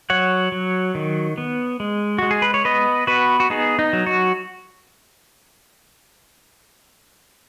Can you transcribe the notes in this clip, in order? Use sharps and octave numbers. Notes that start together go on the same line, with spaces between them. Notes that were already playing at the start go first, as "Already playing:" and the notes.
F#3 C#5 F#5
F#3
D#3
B3
G#3
G#3 F#4
G#4
B4
C#5
B3 B4 D#5
B3 F#4 B4
F#4
B3 D#4 G#4
D#4
F#3
F#4